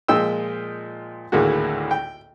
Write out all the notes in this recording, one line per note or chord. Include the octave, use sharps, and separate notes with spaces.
A#2 F3 G#3 D#5 G5 E6
G#1 D2 A2 G#3 A#3 F#4
G5